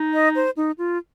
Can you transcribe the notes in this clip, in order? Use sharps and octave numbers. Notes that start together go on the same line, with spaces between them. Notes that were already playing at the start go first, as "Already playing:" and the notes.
Already playing: D#4
D#5
C5
D#4
F4